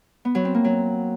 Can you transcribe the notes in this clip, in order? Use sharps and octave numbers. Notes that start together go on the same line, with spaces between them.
B3
F#3
C4
A#3
F#3